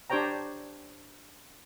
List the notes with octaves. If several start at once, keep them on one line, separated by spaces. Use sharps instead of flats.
D4 G4 C5 C#5 G5 A#5